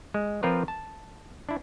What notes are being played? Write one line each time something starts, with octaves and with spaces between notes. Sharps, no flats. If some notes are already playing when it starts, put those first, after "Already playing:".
G#3
F3 C4 F4 A#4 B4 D5
A5
D4 E4